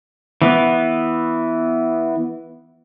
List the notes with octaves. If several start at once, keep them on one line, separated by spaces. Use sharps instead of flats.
E3 B3